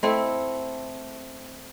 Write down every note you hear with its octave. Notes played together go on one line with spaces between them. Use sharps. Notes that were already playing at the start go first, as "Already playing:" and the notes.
A3 C4 E4